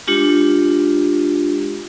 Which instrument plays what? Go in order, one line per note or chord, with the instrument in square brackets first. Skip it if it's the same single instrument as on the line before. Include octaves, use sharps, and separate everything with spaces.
[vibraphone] G#3 D4 F4 G4